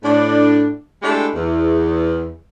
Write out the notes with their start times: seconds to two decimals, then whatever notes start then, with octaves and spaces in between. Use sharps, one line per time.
0.03 A2 D4
1.02 G#3 A3 D4 E4 G4
1.34 E2